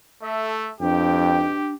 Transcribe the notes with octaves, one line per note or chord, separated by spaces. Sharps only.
A3 A4 E5
F2 G#2 B2 D4 G4 G5